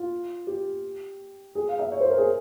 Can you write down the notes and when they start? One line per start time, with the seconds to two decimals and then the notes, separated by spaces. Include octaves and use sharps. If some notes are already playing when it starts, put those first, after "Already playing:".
Already playing: F4
0.47 G4
1.55 G#4
1.68 F5
1.79 E5
1.92 C#5
2.01 C5
2.10 A#4
2.18 G#4